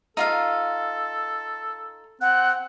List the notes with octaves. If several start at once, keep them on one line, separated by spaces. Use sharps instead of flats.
D#4 F4 A4 F5
C4 F#5 F#6